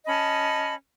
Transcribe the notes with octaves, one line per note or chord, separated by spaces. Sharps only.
C#4 D#5 A5 B5